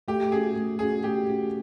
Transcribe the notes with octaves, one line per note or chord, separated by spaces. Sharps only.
A3 G4
C#4 F#4 G#4
A3
C#4 F#4 G#4
A3 G4
C#4 F#4